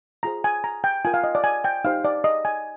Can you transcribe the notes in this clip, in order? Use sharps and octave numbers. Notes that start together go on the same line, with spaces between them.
F4 G#4 C5 A#5
G#5
A#5
G5
F4 A#4 G#5
F5
D#5
D5
G#5
G5
D#4 G4 C5 F5
D5
D#5
G#5